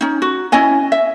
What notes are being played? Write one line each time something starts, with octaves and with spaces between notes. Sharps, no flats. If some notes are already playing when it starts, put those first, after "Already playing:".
C#4 D#4
F#4
C#4 E4 D#5 G#5
E5